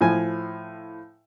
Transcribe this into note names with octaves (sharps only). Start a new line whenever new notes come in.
A2 F3 G#5